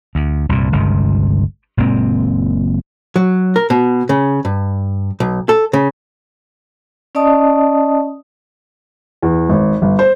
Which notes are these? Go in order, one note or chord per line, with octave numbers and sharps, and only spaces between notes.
D2
C2 G2 A#2
G1 C#2 G2 C3
F#1 A#2 G#3 C4
F#3
A#4
B2
C#3
G2
B1
A4
C#3
C#4 D5 D#5 A5 D#6
E2
G#1
G1
C5